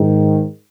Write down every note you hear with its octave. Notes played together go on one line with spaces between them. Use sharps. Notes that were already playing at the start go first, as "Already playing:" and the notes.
Already playing: G#2 D#3